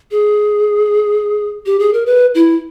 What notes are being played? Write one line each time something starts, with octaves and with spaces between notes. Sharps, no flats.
G#4
G4
G#4
A#4
B4
E4